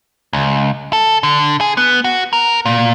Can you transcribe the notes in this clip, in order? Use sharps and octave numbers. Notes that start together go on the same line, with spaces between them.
C#2
A4
D3
G#4
B3
F#4
A#4
A#2